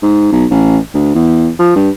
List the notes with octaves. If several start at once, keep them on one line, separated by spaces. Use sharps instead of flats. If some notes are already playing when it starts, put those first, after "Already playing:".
G#2
B1
A1
D2
E2
F3
G2